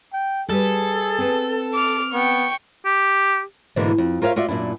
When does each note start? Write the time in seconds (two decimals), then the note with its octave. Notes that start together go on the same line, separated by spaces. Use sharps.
0.13 G5
0.50 G3 G#4 A4 B4
1.18 C4 B4 A5
1.74 D6 F6
2.13 B3 G5 C#6
2.85 G4
3.76 G#2 B2 D3 E3 G#3 A#3
3.98 F2
4.22 F4 A#4 C5 C#5 E5 F5
4.36 F4 F#4 D5 E5
4.48 F#2 A#2 D4 E4